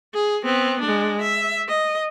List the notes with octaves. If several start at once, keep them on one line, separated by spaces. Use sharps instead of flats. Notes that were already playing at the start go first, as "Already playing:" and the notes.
G#4
B3 C4
G#3 D4
E5
D#5